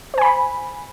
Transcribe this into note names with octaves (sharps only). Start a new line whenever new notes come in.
C5 G#5 B5